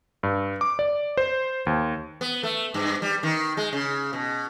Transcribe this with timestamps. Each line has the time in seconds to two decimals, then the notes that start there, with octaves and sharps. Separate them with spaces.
0.23 G2
0.61 D6
0.79 D5
1.17 C5
1.67 D#2
2.21 B3
2.43 A3
2.74 G2
3.02 G3
3.23 D#3
3.57 G#3
3.73 C#3
4.13 B2